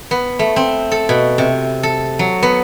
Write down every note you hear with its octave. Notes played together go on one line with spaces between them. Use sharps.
B3
A3
C4
A4
B2
C3
A4
F#3
B3